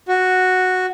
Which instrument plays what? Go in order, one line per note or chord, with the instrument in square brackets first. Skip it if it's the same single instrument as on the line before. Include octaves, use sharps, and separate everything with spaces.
[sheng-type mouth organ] F#4